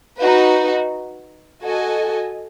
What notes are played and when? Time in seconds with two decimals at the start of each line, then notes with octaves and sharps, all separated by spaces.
0.19 D#4 F#4 B4
1.63 F#4 A4 D#5 G#5